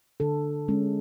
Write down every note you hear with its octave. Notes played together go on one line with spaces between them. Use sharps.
D3 A4
G#3 C#4